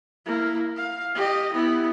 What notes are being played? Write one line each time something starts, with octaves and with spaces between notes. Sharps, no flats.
A#3 E4
F5
G4 D#5
B3 E4